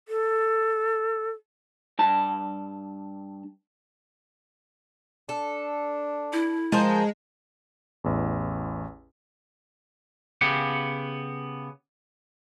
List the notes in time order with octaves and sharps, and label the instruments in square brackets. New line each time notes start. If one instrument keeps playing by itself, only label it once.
[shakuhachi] A4
[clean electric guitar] G2 A5
[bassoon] D4 [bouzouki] A4
[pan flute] E4
[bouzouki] F3 A#4 C5 [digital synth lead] G#3 [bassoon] G#4
[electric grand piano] A1 E2
[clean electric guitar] C#3 B3 G4 F#5